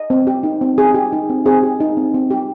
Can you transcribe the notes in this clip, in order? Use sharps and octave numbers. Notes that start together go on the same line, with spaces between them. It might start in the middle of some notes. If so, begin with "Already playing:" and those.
Already playing: D#5
C4
G4
D#4
C4
C4 G#4
G4
D#4
C4
C4 G#4
G4
D#4
C4
C4
G4